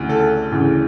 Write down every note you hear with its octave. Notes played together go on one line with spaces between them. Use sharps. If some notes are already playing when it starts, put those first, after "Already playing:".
Already playing: D2 C#3 E3
A4
D2 C#3 E3